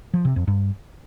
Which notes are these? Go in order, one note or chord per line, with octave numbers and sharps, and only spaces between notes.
F3
C3
F2
G2